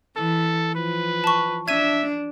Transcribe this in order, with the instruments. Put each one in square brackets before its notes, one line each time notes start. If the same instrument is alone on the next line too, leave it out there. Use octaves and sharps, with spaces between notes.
[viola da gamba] E3 [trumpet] A4
[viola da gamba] F3 [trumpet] B4
[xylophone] A5 C#6
[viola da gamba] D4 [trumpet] E5 [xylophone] G#6 D#7